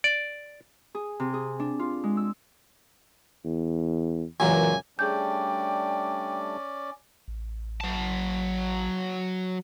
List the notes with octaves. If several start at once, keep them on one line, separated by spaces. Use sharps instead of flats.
D5
G#4
C3
G#4
D4
F4
G#3
E6
E2
C#2 F#2 A#2 E3 G#5
G3 A3 C#4 D4 G#4 D5 G5 G6
A1
F#3 A5